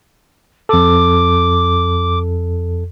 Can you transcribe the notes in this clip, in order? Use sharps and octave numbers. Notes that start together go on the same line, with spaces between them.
F2 A4 D6